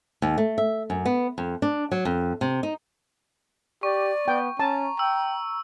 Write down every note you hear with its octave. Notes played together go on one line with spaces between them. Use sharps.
D#2
A3
E5
F#2
B3
F2
D4
F#3
F2
C3
D#4
G4 D5 C#6
B3 G5
C#4 A5 A#5
G5 E6